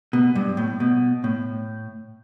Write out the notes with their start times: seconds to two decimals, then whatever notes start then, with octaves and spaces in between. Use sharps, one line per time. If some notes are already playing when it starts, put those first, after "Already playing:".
0.13 B2
0.36 G2
0.57 A2
0.80 B2
1.24 A2